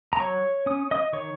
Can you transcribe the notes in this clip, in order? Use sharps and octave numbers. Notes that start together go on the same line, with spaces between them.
A#5
F#3 C#5 C#6
C#4 D#6
D#5 D#6
D#3 C#5 C#6